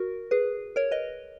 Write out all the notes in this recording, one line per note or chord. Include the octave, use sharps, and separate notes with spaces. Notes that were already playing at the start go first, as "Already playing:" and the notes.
Already playing: F#4 A#4
G#4 B4
A#4 C#5
B4 D#5